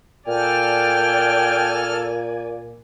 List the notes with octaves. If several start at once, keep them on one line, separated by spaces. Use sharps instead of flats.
A#2 A4 D5 G5 G#5 F6